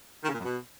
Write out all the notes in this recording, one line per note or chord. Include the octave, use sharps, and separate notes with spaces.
D#3
C#3
A#2
F#2
B2